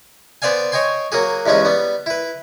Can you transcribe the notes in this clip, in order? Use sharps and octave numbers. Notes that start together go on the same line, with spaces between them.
B3 C5 D5 F5 G#5
C#5 D#5 G5 G#5 C6
F#3 A#3 F#4 G#4
E2 G2 G#3 C#4 D#4
G3 B3
E4 B4